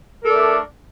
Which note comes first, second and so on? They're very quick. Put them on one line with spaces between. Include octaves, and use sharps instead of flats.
A#4 A4 D5 A3 D4